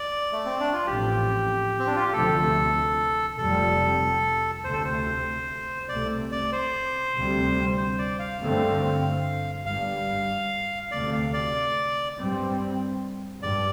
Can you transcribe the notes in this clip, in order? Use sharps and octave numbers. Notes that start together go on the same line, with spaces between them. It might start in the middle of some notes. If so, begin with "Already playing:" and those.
Already playing: D5
A3
C4
D4
F4
A1 A2 F3 C4 G4
C4
D4
F4
G4
D2 C3 F3 A3 A4
F1 F2 C3 G3 A4
D2 C3 A3 C5
A4
C5
C2 C3 A3 D5
D5
C5
D2 C3 G3 C4
C5
D5
F5
G2 D3 A3 C4
G1 G2 G3 F5
D2 C3 A3 D5
F5
D5
G2 G3 C4
G2 D5